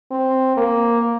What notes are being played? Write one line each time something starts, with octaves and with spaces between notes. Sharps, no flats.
C4
A#3